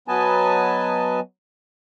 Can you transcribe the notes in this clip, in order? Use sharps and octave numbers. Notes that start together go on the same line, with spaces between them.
F#3 B3 B4 D#5 G#5 A5